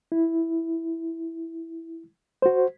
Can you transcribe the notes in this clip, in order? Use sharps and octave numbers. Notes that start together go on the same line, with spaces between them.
E4
F#4 C5